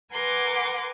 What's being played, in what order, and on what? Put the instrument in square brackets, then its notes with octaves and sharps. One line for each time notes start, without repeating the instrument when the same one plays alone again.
[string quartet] A#4 B4 F#5 G#5 C6 D6